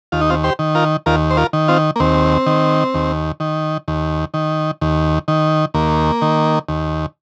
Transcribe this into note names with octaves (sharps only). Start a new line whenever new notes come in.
D#2 F4
D#4
C4 F4
G4 C5
D#3
F4 A#4
D#2 F4 A#4
C5
F4 A#4
D#3
C4 F4
A#3
D#2 C4
D#3
D#2
D#3
D#2
D#3
D#2
D#3
D#2 A#3
D#3
D#2